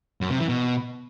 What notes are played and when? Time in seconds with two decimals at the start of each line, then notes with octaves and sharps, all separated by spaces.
0.21 F#2
0.30 C3
0.39 E3
0.49 B2